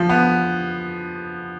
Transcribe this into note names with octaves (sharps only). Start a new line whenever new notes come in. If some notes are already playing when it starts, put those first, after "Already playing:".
Already playing: F3
B3